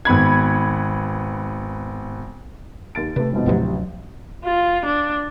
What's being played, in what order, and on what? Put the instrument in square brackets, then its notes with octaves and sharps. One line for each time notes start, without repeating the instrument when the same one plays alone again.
[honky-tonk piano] G#1 B3 B5 G#6
[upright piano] D#2 A6 D7
[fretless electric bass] C3 [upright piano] A3 G4 B4
[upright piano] F2 G#2 B2
[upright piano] A1 C3 [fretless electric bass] D2 F3 F#3
[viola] F4
D4